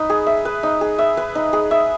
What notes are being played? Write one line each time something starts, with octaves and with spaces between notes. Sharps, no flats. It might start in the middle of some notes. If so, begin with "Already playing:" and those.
Already playing: D#4 B4
G#4
E5
B4
D#4
G#4
E5
B4
D#4
G#4
E5